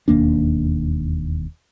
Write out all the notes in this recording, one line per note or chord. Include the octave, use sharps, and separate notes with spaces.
E1 D#2 A#3 D4